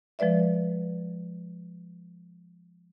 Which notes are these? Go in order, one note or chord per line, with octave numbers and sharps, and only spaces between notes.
F3 G#3 B4 D5 E5